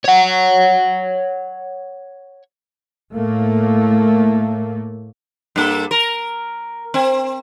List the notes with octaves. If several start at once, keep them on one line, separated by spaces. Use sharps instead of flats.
C#5 F#5
A2 A3 A#3
G2 A#3 A4
A#4
C4